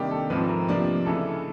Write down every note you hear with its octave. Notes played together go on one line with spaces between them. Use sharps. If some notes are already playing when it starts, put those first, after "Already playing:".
Already playing: C3 D#3 G3 A#3 D4 G4
A4
G#2 F3 A3 C4 B4
A#4
C3 F3 A#3 D4
C#3 E3 A3 A4